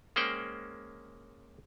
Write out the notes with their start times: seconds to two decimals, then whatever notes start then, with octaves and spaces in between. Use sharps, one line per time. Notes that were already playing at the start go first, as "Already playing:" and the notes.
0.16 G#3 A#3 C#4 C5 F#5 G5